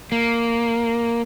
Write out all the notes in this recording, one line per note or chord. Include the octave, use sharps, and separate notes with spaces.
A#3